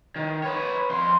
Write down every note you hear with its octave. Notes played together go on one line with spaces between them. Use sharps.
D#3
B4 C#5
F2 C6